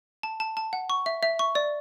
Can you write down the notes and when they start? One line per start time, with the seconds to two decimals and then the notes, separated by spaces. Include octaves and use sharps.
0.23 A5
0.40 A5
0.57 A5
0.73 F#5
0.90 C#6
1.06 E5
1.23 E5
1.39 C#6
1.55 D5